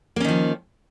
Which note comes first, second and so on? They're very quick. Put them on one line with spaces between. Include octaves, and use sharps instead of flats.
A#3 C#4 D#3 F3